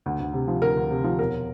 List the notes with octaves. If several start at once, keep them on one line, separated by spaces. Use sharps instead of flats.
D2
D2
C3
F3
D2 A#4
D2
C3
F3
E1 A#4